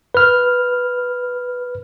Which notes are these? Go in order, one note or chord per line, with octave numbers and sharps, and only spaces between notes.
B4 F6